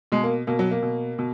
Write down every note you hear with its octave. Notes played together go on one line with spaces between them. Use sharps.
B2 G#3
A#3
B2 A#3
F#3
A#3
B2
B2